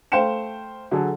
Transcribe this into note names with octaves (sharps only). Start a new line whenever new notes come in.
A3 C5 F5 G5 C#7 E7
D3 F#3 G#4 A4